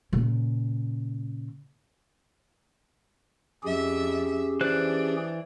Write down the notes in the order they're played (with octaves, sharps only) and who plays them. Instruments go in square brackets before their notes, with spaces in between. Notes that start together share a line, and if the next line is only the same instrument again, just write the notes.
[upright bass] A#2 C#3
[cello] F2 E5 [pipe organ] C#4 G4 G#4
[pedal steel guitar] E3 C5 F#6 [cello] D4